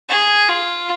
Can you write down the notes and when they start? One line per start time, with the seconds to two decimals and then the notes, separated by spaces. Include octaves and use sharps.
0.09 G#4
0.48 F4